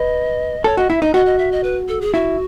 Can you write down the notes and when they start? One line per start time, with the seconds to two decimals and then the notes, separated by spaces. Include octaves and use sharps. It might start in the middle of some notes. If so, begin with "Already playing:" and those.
Already playing: B4 D#5
0.64 A4 C#5
0.77 F#4 D#5
0.90 E4 E5
1.02 D#4 D#5
1.14 F#4 D#5
1.26 D#5
1.38 E5
1.52 D#5
1.63 B4
1.88 A4
2.01 G#4
2.14 E4 F#4